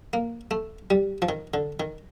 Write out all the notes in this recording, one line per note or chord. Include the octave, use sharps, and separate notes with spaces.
A#3
A3
G3
F3
D#3
D3
D#3